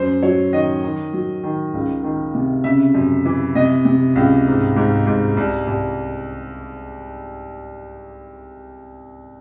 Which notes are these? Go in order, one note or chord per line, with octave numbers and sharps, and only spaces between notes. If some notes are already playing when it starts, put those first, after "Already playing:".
Already playing: F#2 C5
F#3 C#5
D#3 D#5
D#3
F#3
D#3
C#2
D#3
C3
C#3 E5
F#2
E3
C3 D#5
C3
C#2
G#2
G#2
G#2
C2
C2